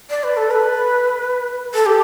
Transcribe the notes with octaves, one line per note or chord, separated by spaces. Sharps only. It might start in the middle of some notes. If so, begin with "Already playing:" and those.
D5
B4
A4
B4
A4
G4